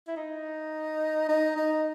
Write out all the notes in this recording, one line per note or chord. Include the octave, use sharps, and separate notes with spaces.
E4
D#4
D#4
D#4